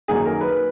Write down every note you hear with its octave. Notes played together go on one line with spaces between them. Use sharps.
F#2 D#3 A#3 G#4
A#4
B4